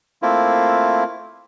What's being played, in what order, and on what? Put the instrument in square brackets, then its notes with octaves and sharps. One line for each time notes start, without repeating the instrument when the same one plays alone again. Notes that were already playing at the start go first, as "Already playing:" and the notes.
[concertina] A3 A#3 C4 E4 F4